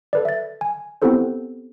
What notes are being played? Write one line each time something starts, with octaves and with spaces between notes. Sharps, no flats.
A4 B4 D5
E5 A6
G#5
B3 C4 E4 G4 A4 C5